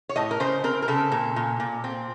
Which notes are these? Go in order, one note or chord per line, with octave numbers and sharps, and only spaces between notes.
C#5
A2 D#5
A#4
C#3 C5
C4 A#4
A#4
C#3 A4
A#2
A#2
A#2
C4